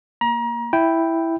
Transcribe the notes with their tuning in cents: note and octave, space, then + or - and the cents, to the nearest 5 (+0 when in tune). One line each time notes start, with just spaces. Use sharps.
A#3 +0 A#5 +30
E4 +0 G5 -5